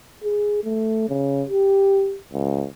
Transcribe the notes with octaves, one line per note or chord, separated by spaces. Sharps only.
G#4
A3
C#3
G4
C#2